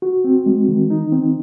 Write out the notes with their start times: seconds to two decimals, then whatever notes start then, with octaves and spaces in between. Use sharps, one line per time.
0.02 F#4
0.24 C4
0.46 G#3
0.68 D#3
0.90 D#4
1.12 C4